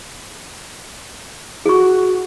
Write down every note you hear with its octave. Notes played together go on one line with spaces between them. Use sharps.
F#4 G#4 C#6